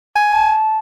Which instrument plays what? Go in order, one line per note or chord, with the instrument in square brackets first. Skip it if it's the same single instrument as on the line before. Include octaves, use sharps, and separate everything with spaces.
[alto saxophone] G#5
[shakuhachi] A5